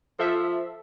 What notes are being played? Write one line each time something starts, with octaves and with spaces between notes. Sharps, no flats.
F3 A4 E5